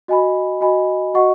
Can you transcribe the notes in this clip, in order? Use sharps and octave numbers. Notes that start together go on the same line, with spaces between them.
F#4 D#5 G#5 B5
F#4 D#5 G#5 B5
F#4 D#5 F#5 C#6